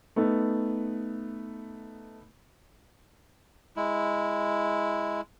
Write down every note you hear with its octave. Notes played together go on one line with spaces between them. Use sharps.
A3 B3 D#4
G#3 E4